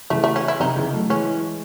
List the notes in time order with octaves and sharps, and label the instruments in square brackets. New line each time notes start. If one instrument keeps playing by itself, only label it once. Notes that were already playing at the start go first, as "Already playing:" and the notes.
[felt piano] C#3 E3 [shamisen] A3
[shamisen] A3
C#4
E4
[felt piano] C3 D#3 [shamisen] D#4
[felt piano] C#3 E3
F#3 A3
[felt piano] E3 G#3 [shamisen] C#4